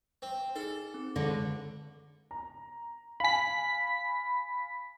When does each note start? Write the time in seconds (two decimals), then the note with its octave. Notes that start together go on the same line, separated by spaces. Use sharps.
0.22 C4
0.56 D#4 G#4 A4
0.94 C4
1.16 C#2 D3 A#6
2.31 A#5
3.20 F5 G#5 B5 B6